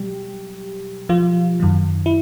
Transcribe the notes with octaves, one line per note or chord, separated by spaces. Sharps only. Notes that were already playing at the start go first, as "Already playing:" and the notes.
Already playing: B2 F#3 G3 G4
F3 F4
F#2 D#3 F#3
E4